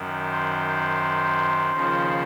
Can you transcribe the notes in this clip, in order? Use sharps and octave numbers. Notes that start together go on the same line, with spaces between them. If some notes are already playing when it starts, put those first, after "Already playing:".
Already playing: F#2 D#3
C5
D#2 C#3 F3